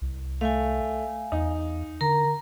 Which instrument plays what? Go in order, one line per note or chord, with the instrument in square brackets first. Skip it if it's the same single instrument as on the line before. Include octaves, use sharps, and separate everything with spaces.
[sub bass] C2
[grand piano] A3 [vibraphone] F5 G#5
[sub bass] E2 [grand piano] D#4
[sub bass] D3 [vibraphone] A#4 A#5